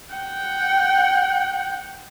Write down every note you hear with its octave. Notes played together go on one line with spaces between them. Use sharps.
F#5 G5